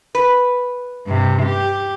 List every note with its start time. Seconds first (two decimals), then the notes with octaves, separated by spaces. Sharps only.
0.15 B4
1.07 G2 C3
1.43 G4